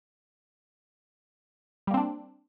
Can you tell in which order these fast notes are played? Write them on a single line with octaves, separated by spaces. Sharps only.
G3 A#3 C4 D4